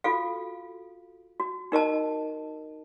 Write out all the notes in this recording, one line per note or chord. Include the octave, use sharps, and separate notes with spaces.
F4 F#4 A4 F5
F#4
D#4 A#4 D#5 A5